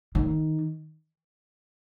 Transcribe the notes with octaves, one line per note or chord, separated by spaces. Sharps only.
D#3